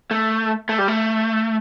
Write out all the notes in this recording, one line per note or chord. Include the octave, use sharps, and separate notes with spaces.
A3
A3
G3
A3